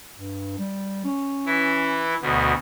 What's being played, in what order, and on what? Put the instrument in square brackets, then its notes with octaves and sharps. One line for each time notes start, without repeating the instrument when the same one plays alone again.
[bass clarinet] G2
G3
C#4
[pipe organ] E3 E4
D2 B2